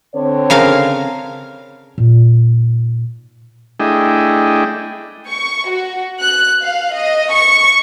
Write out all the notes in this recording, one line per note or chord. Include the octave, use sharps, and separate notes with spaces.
D3 C4 C#5
C#3 A#4 F5
A#2 D#4
A3 D4 E4 G#4 D#5 G5
C#6
F#4
F#6
F5
D#5
C#6